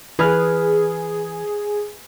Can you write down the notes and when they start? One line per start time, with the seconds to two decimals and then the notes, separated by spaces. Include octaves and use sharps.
0.19 E3 G#4 B4 F6 F#6